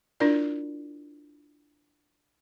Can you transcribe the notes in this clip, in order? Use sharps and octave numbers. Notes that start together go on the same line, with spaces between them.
D4 E4 F4 A#4 D5